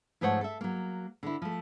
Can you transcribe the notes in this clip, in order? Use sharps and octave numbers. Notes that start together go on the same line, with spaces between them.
G#2 F3 A3 C5 C#5 F#5
A4 E5
F#3 A#3
D3 E4
F3 A3